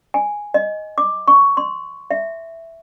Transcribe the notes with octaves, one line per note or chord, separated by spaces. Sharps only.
G#5
D#5
D6
C#6
C6
E5